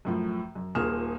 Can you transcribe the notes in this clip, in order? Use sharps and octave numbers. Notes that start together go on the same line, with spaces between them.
F#2 A2 F3
F#2
D#1 A#2 A#3 G#4 F6 E7